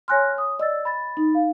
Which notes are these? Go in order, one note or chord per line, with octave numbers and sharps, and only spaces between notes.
C#5 G#5 C6 F6 F#6 A#6
D#6
D5 D#5 E6 A6
B5 A6
D#4
F5